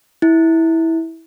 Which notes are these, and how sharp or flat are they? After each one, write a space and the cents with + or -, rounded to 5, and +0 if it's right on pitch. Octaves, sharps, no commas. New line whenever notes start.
E4 -15